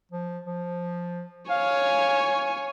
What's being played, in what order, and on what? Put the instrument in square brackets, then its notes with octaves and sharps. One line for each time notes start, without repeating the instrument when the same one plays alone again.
[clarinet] F3
F3
[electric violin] C#5 G#5 [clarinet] F5